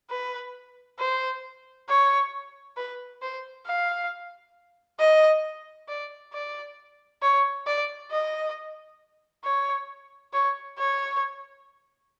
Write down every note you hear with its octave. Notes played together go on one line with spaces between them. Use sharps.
B4
C5
C#5
B4
C5
F5
D#5
D5
D5
C#5
D5
D#5
C#5
C#5
C#5